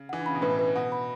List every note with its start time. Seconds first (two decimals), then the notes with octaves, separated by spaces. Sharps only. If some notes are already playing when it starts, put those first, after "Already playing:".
Already playing: C#3
0.09 E3 F#5
0.20 D3
0.26 C#3 B5
0.35 B2
0.42 A2 B4
0.59 B4
0.75 B2 F#5
0.92 B5